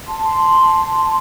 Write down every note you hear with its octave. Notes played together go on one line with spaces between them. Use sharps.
A5 C6